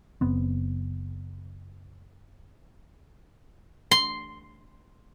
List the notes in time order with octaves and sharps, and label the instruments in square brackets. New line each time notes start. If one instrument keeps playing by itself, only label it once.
[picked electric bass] F#1 B3 C4
[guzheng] C6